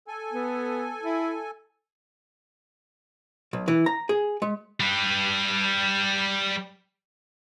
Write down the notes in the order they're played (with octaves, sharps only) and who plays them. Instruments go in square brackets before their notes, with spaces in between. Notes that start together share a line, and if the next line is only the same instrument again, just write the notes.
[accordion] A4 G#5
[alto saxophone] B3
E4
[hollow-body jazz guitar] B1
E3
A#5
G#4
G#3
[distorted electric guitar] G3 B4